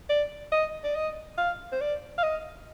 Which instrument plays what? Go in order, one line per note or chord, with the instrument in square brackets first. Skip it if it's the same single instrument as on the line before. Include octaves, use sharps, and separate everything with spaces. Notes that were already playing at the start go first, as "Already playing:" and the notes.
[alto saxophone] D5
D#5
D5
D#5
F5
C5
D5
F5
D#5